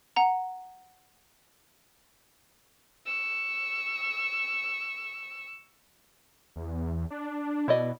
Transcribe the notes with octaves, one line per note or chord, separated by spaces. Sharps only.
F#5 A#5
C#6 E6
E2
D4
B2 E4 D5 D#5